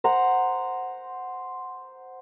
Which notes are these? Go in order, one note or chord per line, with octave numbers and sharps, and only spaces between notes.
C5 F#5 A#5